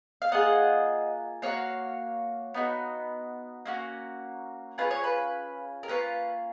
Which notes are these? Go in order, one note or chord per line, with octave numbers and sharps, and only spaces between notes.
F5
A#3 F4 G#4 D#5 F#5
A#3 D#4 F#4 C#5 F5
B3 D#4 F#4
A#3 C#4 F#4
C#4 F4 G#4 B4
C#5
B4
A#4
A#3 C#4 F4 B4